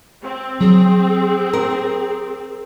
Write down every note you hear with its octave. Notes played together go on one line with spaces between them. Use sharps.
C4
F#3 G#4
A#4